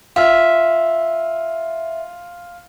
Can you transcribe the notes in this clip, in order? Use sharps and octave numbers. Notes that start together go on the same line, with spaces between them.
F4 E5